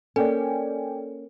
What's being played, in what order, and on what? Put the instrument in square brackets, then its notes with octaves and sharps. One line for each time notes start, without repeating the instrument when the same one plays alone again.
[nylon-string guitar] A#3 C#4 [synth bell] A4 [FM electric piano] D5 G5 G#5